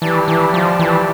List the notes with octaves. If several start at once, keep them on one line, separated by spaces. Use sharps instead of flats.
E3 G4 D5 A5
E3
F3
E3